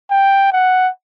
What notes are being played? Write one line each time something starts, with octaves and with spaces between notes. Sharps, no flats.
G5
F#5